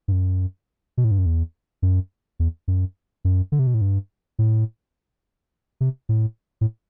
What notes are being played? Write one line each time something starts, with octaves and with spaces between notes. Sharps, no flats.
G2
F#2
B2
A2
G2
F#2
E2
F#2
E2
F#2
F#2
D3
C3
B2
A2
G2
A2
C3
A2
A2